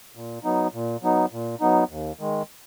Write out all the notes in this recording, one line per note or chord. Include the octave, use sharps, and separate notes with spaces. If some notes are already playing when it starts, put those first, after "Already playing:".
A#2
F#3 B3 D#4
A#2
F#3 B3 D#4
A#2
F#3 B3 D#4
D#2
D#3 G#3